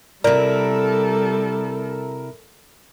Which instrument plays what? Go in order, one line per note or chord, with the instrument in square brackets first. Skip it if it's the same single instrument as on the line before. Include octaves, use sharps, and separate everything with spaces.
[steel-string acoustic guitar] C3 E4 [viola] G3 A4 [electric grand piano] A#4 [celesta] D5